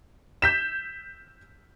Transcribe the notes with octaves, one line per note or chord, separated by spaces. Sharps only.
G6 B6 E7